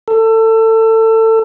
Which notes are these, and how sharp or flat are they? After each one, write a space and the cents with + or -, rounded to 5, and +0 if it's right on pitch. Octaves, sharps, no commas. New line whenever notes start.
A4 +25